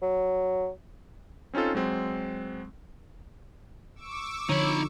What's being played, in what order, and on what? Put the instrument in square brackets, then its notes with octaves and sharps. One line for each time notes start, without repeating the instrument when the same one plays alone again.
[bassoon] F#3
[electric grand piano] C4 C#4 D#4 F4 A4
F#3 G#3 C4
[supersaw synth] C#6 D6 E6
[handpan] D3 F3 [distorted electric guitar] D#4 B5 [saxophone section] C#5